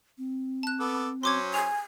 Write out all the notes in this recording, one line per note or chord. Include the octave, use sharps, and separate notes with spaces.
C4
A5 F#6
B3 A4 D6
F#3 C#4 C5 C6 D6 G#6
G#5 F7